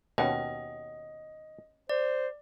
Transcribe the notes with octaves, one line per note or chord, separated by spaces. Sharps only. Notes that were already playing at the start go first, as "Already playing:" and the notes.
D#2 B2 C#4 D#5 F#5 G5
C5 D5